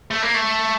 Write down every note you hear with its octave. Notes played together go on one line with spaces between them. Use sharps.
A3
A#3
A3